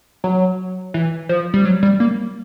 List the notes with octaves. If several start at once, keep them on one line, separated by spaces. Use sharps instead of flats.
F#3
E3
F3
G3
F#3
G3
A#3